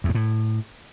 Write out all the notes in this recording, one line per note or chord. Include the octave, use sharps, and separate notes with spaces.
E2
G2
A2